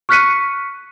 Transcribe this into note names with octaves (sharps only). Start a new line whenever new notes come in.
C#6 F6 F#6 B6 C#7 D#7